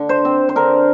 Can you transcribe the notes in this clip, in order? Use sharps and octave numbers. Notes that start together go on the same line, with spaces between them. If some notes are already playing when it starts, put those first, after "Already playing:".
Already playing: D3
C5
C4
C5
D3 A#4